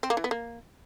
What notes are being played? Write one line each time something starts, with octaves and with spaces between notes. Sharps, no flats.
C4
A#3
E3
B3
A#3